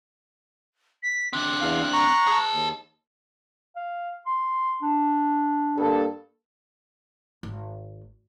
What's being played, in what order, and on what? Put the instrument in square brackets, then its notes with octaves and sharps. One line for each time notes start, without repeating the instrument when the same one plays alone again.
[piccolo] B6
[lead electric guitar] C4 D4 [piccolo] F#6
[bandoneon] E2 F5
A#5 C#6
[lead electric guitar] G#4 A5
[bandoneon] D#2
[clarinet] F5
C6
D4
[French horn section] G2 A#3 A4
[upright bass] G#1